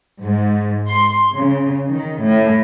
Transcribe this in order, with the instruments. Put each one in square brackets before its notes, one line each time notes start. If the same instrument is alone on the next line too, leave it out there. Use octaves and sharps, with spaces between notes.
[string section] G#2
C6
C#3
D#3
A2